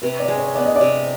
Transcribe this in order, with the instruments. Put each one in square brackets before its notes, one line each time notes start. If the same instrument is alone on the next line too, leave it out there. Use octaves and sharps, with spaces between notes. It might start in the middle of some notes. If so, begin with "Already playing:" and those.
[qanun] C3 [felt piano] B4
[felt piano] D5
[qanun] G#3
[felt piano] C#5
[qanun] B3 [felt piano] D5
[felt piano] D#5
D5
[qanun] C3